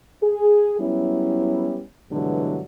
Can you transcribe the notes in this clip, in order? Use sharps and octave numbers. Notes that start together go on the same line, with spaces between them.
G#4
F#3 G3 B3 C#4 E4
G2 B2 D3 E3 F#3 G#3